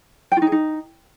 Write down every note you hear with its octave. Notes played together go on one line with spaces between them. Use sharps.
G5
F4
D#4
G#4
D#4